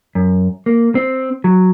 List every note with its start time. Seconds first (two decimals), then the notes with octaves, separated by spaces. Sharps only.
0.15 F#2
0.66 A#3
0.95 C4
1.44 F#3